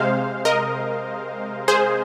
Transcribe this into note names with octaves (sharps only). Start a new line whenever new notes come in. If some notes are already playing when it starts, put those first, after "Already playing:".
Already playing: C3 G#3 C5 F5
A#4 D#5
G#4 C5